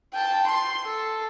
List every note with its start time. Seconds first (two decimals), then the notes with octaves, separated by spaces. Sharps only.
0.14 G5 A5
0.47 C6
0.85 A4